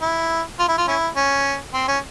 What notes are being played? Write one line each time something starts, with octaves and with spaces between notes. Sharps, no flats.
E4
F4
E4
F4
C#4 E4
C#4
C4
C#4